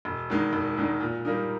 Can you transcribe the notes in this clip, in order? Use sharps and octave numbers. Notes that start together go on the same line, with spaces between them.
E1
E2 D#3 G#3 D#4
E1
E2 D#3 G#3 D#4
A#2
G3 A#3 D#4